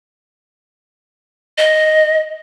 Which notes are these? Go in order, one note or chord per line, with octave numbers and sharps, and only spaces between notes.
D#5